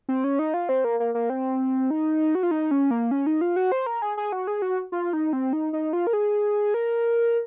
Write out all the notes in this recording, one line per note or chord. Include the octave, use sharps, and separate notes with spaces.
C4
C#4
D#4
F4
C4
A#3
A#3
A#3
C4
D#4
F#4
F4
D#4
C#4
A#3
C#4
D#4
F4
F#4
C5
A#4
G#4
G#4
F#4
G#4
F#4
F4
D#4
C4
D#4
D#4
F4
A#4
G#4
A#4